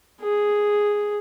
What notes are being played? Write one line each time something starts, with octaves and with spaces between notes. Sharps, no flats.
G#4